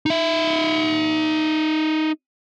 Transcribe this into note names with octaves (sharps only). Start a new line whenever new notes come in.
D#4 E5